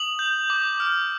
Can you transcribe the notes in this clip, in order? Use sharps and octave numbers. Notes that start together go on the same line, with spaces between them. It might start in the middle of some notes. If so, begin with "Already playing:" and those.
Already playing: D#6 F#7
G6
D6
F6